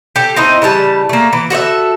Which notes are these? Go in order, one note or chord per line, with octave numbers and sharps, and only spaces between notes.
G4 A4
C4 D#4 E4 D#5
C#3 E3 G3 A5
A3 A#3
E3
F#4 A4 C#5 E5